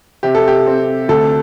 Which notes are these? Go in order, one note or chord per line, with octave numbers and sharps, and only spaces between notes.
C3 G4
A4
G4
C4
D2 A4